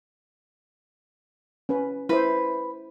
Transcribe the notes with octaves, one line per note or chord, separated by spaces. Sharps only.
C#4 B4
E4 B4 C5